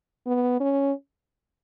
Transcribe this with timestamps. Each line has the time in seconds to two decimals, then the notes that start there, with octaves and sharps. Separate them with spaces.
0.26 B3
0.60 C#4